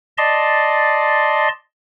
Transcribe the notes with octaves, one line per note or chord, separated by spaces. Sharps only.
D5 D#5 A5 C6